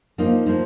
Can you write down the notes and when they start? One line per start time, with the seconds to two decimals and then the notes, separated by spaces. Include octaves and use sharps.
0.18 F3 A#3 D#4
0.46 F3 A#3 D#4